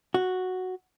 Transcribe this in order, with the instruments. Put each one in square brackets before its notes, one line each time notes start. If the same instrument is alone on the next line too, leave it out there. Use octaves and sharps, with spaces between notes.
[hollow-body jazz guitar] F#4